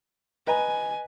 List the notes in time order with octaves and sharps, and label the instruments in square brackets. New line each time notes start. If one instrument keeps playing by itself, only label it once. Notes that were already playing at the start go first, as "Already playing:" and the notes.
[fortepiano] B4 D#5 A#5 [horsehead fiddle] G#5